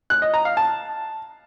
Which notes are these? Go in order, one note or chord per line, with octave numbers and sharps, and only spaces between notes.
F#6
D#5
A#5
F5
A5